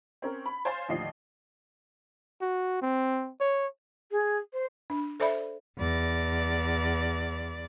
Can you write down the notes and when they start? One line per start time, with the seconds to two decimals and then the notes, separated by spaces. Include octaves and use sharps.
0.22 C4 C#4 A#4
0.46 B5
0.65 C5 C#5 F5 G#5 C6 A6
0.88 D#2 A2 D3 F3 D#5 C7
2.41 F#4
2.82 C4
3.41 C#5
4.11 G#4
4.53 C5
4.90 D4
5.20 A4 C5 D5 E5 B5
5.78 E2 D5